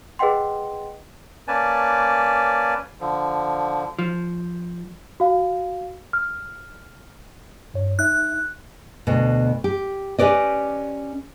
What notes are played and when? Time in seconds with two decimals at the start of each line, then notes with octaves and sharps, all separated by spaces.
0.19 G#4 B4 D#5 F#5 G5 C6
1.48 A#3 C#4 B4 D5 G#5 A5
3.00 D3 F3
3.99 F3
5.20 F#4 F5
6.13 F6
7.74 G2 C#5
7.99 D#4 E5 F#6
9.07 D2 B2
9.64 G4
10.19 C#4 G4 B4 D5 D#5